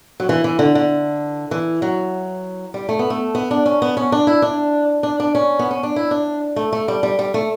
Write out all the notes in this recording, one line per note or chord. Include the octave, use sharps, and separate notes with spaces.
F#3
E3
E3
D3
D3
E3
F#3
G3
A3
B3
A3
B3
D4
C#4
B3
C#4
D4
E4
D4
D4
D4
C#4
B3
C#4
D4
E4
D4
A3
A3
G3
G3
G3
A3